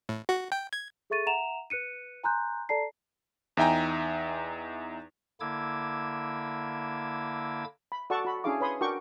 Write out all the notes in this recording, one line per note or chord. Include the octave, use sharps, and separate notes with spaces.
A2
F#4
G5
G#6
G#4 A4 E5 C#6 A6 D#7
E5 F#5 A#5 E7 F7
B4 F#6 C#7 D#7
G#5 A#5 C6 F#6 G6
A4 D5 A5 A#5 C7
E2 D#4 E5 G5 G#5 A#5
D3 A#3 E4 D6 E6 G#6
B5
F#4 A4 D5 F#5 A5 C#6
F#4 B5
C#4 D4 E4 G#4 F5 D6
B4 C#5 B5 C6 D#6
D4 F#4 A#4 G5 C#6 D6